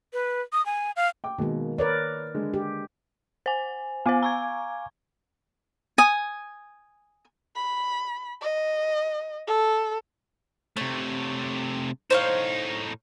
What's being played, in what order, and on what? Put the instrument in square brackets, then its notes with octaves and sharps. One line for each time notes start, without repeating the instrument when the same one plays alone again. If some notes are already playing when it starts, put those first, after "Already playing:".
[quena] B4
D#6
G#5
F5
[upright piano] G5 D6
[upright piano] B2 G#3 [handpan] D#3 A#3
[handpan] A#4 B4 D5 [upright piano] C#5
[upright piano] D3 G#3
[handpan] G4
[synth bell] C5 G#5
[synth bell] B3 C5 [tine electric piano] F5 G#5 D6
[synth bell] A#5 C#6 G#6
[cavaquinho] G#5 D#6
[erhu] B5
D#5
A4
[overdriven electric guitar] C3 A3 [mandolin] C#5
[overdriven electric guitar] A2 D#4 [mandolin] C5 C#5 F5